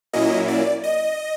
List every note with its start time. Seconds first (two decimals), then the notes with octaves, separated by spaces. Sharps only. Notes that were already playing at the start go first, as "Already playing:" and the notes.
0.13 A#2 F#3 A#3 C#4 E4 D#5
0.48 D5
0.84 D#5